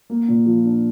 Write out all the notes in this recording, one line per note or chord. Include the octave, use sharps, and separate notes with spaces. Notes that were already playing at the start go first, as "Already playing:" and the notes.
A#3
A#2
F3
D4